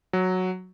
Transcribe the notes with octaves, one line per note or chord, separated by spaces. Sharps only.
F#3